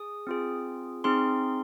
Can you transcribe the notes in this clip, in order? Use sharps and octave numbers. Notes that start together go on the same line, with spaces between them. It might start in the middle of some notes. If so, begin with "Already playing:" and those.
Already playing: G#4 D#6
C4 F4 G#4
C4 D#4 G#4 C6